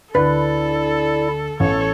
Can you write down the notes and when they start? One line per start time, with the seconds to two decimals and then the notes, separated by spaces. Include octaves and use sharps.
0.15 D2 E4 A4 B4 D5
1.60 A1 E3 A4 C#5